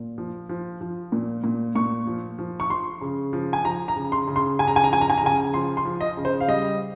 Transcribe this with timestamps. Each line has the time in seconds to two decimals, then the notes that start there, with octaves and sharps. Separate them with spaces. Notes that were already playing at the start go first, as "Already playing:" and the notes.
Already playing: A#2
0.18 F3
0.49 F3
0.81 F3
1.12 A#2
1.44 A#2
1.75 A#2 C#6
2.07 F3
2.39 F3
2.60 C#6
2.70 F3 C6
3.01 C#3
3.33 F3
3.53 G#5
3.65 F3 A#5
3.88 A#5
3.96 C#3
4.12 C6
4.28 C#3
4.36 C6
4.59 C#3 G#5
4.67 A#5
4.76 G#5
4.84 A#5
4.91 F3 G#5
5.01 A#5
5.10 G#5
5.18 A#5
5.23 C#3 G#5
5.54 F3 C6
5.77 C6
5.85 F3
6.01 D#5
6.17 C#3
6.25 C5
6.40 F5
6.48 G3 D#5